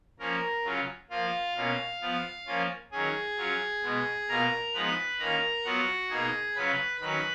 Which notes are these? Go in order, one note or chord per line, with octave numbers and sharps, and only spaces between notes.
F3 A#3 C#4 A#4
C#3 F#3 C#4 F4
F3 A#3 F4 F5
B2 A#3 C#4 F4
F3 B3 F4
F3 A#3 C#4 F4
D#3 F#3 C#4 G#4 G#5
F#3 C#4 F4
B2 G#3 B3
B2 A#3 F4 A#4 A#5
F3 G#3 B3 D#4 B4 B5
D#3 A#3 C#4 F4 A#4 A#5
F#3 B3 F4 F#4 F#5
B2 A#3 D#4 G#4 G#5
C#3 F#3 C#4 F4 B4 B5
D#3 F#3 C#4 B4 B5